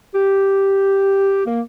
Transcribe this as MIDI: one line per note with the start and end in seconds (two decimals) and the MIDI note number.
0.14 1.41 67
1.46 1.60 58